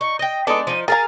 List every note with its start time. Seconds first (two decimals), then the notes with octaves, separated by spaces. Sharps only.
0.01 D#4 C#6
0.19 D#5 G5 A#6
0.47 G#3 B3 D4 D#4 A4 D7
0.67 F3 D#4 D#7
0.88 G#4 A#4 F5 G#5 A#5 A6